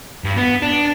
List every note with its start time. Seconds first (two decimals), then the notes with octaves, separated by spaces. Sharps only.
0.24 G2
0.37 B3
0.62 D4